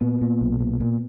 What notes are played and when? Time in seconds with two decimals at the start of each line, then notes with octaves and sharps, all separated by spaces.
0.01 A#2 B3
0.21 A#2
0.41 B1
0.61 A#2
0.80 A#2